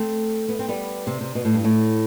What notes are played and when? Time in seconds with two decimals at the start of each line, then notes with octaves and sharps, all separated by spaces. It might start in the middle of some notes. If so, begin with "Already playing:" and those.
Already playing: A3 C4
0.49 B3
0.59 C4
0.68 G3 B3
1.07 C3
1.21 C3
1.35 B2
1.45 A2
1.54 G2
1.64 A2